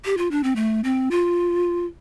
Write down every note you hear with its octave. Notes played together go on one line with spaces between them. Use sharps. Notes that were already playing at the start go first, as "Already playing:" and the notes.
G4
F4
D4
C4
A3
C4
F4